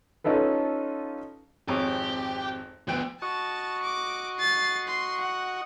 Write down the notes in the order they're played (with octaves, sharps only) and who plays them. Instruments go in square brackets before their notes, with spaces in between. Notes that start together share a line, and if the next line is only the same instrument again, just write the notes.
[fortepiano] C#4 D#4 F4 A4 B4
[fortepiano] G#1 F2 C#5 [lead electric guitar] G4
[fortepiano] D2 G5 [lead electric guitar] F3 B3
[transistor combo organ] F#4 D#5 C#6 [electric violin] A5
[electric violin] D6
A6 C7
C6
F#5